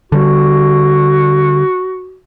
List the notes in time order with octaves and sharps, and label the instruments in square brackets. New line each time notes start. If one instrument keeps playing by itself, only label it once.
[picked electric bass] D3 G3 [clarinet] F#4